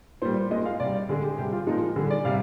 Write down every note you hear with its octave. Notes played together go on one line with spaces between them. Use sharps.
A#2 G3 C5
A#2 G#3 D#5
F5
C3 G3 D5
D3 G#3 G#4
G4
G#4
C3 G3 G4
F4
A#2 F3 G#3 D#4
D3 G3 G#4
D5
C3 G3 F5